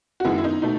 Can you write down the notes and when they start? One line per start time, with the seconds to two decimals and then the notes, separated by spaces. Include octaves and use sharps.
0.20 F#4
0.25 F#2 D#3 G#3 B3 E4
0.38 E4
0.44 D#4
0.62 B2 A3 D#4